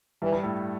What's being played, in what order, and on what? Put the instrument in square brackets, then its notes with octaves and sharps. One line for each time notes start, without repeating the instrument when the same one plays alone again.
[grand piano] G2 G3 [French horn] E3
[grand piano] G2 G3
A2 A3